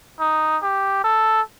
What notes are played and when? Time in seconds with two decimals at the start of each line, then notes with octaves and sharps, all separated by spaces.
0.20 D#4
0.62 G4
1.04 A4